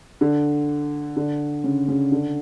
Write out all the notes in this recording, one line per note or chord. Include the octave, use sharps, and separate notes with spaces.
D3
D3
C#3
C#3
D3